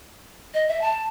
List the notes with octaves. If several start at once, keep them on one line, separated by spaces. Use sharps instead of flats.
D#5
E5
A5